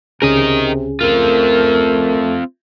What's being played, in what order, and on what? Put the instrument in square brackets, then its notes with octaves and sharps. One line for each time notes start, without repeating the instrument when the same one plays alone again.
[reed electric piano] C#2 C#4 G#4 [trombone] C3 [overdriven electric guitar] A#4 D#5
[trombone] A3 [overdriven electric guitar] C4 F4 [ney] A#4